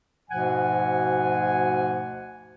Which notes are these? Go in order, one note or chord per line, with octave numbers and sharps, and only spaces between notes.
D2 G#2 B2 F3 F#5 G#5